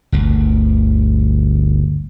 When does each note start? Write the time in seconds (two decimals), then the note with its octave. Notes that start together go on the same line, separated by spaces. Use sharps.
0.12 G1 D2